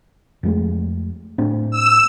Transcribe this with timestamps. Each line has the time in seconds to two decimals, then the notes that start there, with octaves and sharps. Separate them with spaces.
0.43 F2 G#3 A3
1.38 A2 C4 D4
1.71 E6